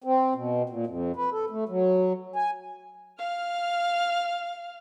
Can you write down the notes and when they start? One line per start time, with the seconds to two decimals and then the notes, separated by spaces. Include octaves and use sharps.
0.04 C4
0.35 B2
0.70 A#2
0.87 F2
1.16 B4
1.32 A4
1.50 A3
1.69 F#3
2.36 G#5
3.19 F5 F6